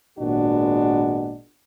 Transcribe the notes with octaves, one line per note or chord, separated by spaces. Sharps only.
G#1 A#2 G#3 B3 D4 F#4